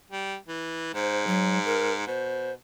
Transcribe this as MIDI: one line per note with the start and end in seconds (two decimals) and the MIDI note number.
0.11 0.36 55
0.48 0.89 52
0.94 2.02 44
0.94 1.24 72
1.27 1.59 54
1.65 1.92 70
2.07 2.54 47
2.07 2.52 72